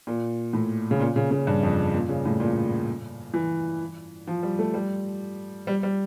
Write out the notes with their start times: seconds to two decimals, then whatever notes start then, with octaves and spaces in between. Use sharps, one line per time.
0.07 A#2
0.53 A2
0.91 C#3
1.00 A#2
1.16 C#3
1.31 C#3
1.47 G2
1.63 F2
1.94 A#2
2.09 C#3
2.25 A2
2.40 A#2
3.34 E3
4.27 F3
4.43 G3
4.59 A3
4.74 G3
5.67 G3
5.83 G3